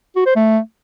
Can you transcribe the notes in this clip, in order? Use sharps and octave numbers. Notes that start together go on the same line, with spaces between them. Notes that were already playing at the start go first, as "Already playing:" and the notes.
F#4
C5
A3